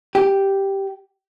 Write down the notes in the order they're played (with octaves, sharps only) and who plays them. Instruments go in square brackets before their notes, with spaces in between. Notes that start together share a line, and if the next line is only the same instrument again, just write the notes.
[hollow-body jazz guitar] G4